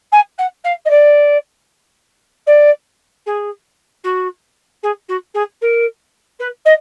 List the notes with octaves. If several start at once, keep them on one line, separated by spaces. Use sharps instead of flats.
G#5
F#5
F5
D#5
D5
D5
G#4
F#4
G#4
F#4
G#4
A#4
B4
D#5